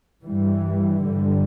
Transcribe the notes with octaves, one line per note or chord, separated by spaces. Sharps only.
G2 E3 G3
G2 D3 G3